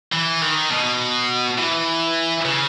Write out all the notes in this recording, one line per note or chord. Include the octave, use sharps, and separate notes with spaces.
E3
D#3
B2
E3
C#3